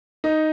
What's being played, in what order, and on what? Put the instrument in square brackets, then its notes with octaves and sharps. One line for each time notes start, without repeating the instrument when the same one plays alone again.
[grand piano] D#4